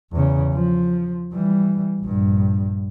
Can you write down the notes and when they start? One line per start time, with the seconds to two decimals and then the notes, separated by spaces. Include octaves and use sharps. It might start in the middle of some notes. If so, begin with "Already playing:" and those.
0.12 E2 C#3
0.53 F3
1.33 E3 G3
2.01 A#1 G2